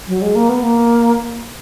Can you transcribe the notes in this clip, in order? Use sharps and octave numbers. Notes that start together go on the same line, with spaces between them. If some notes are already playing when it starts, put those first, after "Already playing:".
F#3
G#3
A#3
B3
A#3